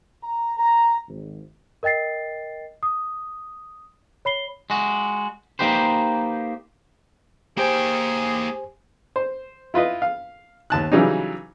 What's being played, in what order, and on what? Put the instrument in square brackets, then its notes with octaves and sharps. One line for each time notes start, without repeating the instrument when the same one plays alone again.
[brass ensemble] A#5
A#5
G#1
[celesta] A#4 D#5 G5 A6 C7
D#6
C#5 B5 C7 G7
[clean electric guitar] G#3 F#4
A#3 D#4 G4 B4 C5
[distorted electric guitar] A#3 G5 [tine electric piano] G4 C5 G#5 [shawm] G#4
[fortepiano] C5
E4 F4 B4 D#5
F5
D#2 A5 F#6
C#3 E3 F#3 G3 C#4 D#4